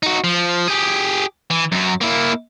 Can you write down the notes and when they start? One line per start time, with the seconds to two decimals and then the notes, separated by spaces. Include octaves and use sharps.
0.03 D#4 F#4
0.24 F3
0.68 G4 G#4
1.50 E3
1.72 F#2 F#3
2.01 A#3 E4